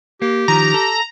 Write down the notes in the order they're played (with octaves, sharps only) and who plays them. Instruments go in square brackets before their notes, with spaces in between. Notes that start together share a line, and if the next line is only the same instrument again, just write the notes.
[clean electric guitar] A#3 [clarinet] G4
[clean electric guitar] D#3 F3 [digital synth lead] A#5
[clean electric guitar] A4